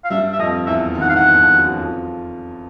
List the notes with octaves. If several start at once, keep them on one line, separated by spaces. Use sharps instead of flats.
F5
G2 G3 E5
E5
F2 F3 D#5
E2 E3 E5
D#2 D#3
F#5
F5
E2 E3 F#5
F2 F3
F#2 F#3
F2 F3